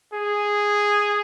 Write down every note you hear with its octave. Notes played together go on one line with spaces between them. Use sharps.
G#4